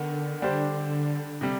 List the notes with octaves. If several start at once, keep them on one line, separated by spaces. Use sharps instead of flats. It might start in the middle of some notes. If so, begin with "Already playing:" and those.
Already playing: D3 D#3 B3
G3 D4 G4 C5
C3 G3